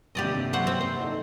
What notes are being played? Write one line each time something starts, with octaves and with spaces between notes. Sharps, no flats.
D#1 G2 C3 G4 D5 D#5
F#3 C5 F#5
C4
C5
D#4 A4